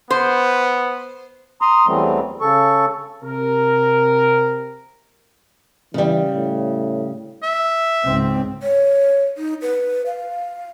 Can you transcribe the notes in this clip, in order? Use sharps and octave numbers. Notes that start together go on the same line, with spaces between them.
B3 C5
A#5 C6 D#6
E2 E3 F#3 G3 A3 C4
C#3 A4 C#6
C3 A#4
C#3 E3 G3
A2
E5
C#2 G#2 C4
C#5
D#4
B4
F5